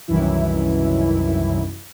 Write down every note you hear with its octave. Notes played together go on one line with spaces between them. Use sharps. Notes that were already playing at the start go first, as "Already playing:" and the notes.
C2 F#2 D#3 E3 E4